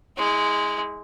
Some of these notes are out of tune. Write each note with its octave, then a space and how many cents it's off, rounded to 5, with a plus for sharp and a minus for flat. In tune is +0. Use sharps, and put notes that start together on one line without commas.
G#3 +0 E4 -30